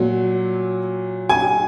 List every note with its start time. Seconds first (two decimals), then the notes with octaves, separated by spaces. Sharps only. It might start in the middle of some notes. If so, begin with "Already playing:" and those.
Already playing: A#2 F#3
1.29 G#5